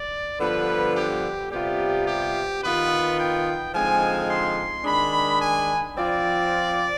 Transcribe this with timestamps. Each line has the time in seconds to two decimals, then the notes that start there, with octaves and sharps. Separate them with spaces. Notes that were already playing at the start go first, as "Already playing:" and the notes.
Already playing: D5
0.39 G2 D3 F3 B3 B4
0.95 G4
1.50 C3 G3 B3 F4 G4
2.06 G4
2.62 D#3 B3 F4 B4
3.17 G5
3.73 D3 F3 G#3 C4 D#4 G#5
4.29 C6
4.84 D#3 G#3 D4 B5
5.40 G#5
5.96 F3 C4 F4 D5